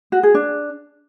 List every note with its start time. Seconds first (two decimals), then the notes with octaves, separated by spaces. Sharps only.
0.12 F#4
0.23 G#4
0.34 D4